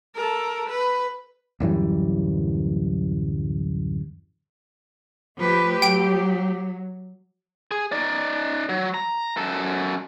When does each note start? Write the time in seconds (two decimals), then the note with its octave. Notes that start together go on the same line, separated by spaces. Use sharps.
0.15 A4 A#4
0.69 B4
1.60 D1 F#2 E3 G3
5.37 F3 A3 G4 B4
5.82 F#3 G5 D7
7.71 G#4
7.92 D#4 D5
8.69 F#3
8.94 A#5
9.37 F#2 A4